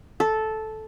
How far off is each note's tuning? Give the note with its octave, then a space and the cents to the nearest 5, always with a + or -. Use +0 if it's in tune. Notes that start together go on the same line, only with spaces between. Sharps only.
A4 -10